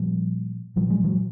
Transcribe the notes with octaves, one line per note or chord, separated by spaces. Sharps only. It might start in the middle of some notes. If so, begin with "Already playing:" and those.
Already playing: A#2 F3 G3
A#2 F3 G3
F#3 G#3
E3 F#3